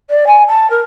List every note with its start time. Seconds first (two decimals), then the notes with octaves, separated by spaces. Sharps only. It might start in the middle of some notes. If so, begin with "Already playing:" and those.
0.10 D5
0.27 G#5
0.48 A5
0.70 A#4